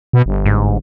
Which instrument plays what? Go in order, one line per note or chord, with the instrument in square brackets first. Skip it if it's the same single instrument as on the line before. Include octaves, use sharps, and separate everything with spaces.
[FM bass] B2
G1
[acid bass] G#2